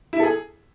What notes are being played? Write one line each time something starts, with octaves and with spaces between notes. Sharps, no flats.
E4
A4
G#4